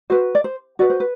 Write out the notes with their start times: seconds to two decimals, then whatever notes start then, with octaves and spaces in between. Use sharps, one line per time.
0.10 F#4 B4 C5
0.35 D5
0.44 C5
0.79 F#4 B4 D5
0.90 C5
1.00 B4